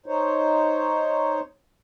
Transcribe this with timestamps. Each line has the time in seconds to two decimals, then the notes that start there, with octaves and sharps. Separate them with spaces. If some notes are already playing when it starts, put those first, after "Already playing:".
0.06 D#4 C5 C#5